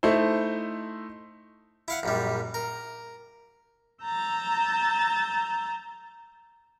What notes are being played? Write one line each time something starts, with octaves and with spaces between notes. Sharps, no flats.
A3 D#4 E4 C5
E4 F5 F#5
A#1 F#2 G3
A#4
A#5 E6 G6 A6